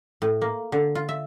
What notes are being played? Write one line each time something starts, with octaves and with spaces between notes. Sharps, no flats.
A2
A#3
D3
F4
E5